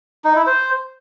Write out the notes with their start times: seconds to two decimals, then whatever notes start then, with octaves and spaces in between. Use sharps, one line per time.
0.24 D#4
0.36 E4
0.47 C5